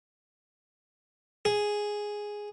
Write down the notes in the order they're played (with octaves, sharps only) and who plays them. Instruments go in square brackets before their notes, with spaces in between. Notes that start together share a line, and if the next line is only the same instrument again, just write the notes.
[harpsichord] G#4